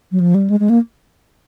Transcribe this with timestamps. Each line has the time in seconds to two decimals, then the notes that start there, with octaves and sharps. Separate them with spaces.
0.12 F#3
0.20 F3
0.35 G3
0.50 G#3
0.60 G#3
0.70 A#3